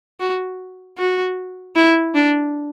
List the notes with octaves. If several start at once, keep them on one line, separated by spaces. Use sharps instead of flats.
F#4
F#4
E4
D4